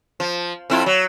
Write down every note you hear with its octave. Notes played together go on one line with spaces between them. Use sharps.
F3
F2 E4 F4
F#3